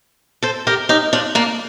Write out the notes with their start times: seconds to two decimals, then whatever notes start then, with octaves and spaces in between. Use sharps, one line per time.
0.43 A4 C5
0.67 G4 A#4
0.89 D#4 G4
1.13 D4 F4
1.35 A#3 D4